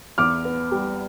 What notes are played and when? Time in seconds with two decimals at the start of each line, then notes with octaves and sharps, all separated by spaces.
0.18 E2 D6 F6
0.45 B3
0.72 G3